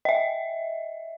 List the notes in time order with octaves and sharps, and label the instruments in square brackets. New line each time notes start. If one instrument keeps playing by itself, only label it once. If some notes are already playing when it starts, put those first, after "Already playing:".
[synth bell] D#5 E5